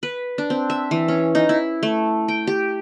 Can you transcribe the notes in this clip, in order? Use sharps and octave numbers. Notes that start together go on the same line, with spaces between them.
B4
D4
C4
E5
E3
C#4
D#4
E4
A3
G5
G4